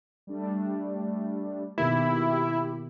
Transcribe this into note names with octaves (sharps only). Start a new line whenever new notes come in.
G3 A3 D4
B2 D#3 A#3 E4 G4